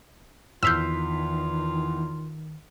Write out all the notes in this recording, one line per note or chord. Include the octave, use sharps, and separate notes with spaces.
E2 D#3 F4 E6 F6 G6 B6 C7